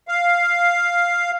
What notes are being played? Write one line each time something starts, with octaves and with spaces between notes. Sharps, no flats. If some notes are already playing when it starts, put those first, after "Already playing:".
F5